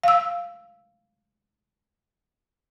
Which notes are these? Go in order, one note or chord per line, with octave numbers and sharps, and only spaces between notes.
F5 E6